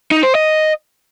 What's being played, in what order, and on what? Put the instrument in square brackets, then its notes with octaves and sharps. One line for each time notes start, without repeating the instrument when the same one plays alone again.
[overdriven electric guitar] D#4
C5
D#5